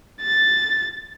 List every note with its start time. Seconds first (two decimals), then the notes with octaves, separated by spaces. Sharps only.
0.22 A6